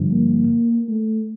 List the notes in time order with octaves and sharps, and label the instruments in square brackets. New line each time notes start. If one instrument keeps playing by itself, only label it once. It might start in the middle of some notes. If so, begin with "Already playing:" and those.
Already playing: [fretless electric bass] G2 D3 F3
[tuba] A#3
A3